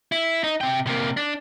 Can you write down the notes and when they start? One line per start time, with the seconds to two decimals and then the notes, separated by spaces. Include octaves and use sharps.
0.12 E4
0.44 D#4
0.61 C3 G5
0.87 C3 A#3
1.17 D4